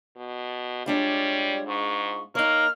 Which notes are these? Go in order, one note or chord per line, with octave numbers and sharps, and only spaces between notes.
B2
G3 G#3 D4 F4 C#5
G#2 C#6
A#3 D#4 C#5 F6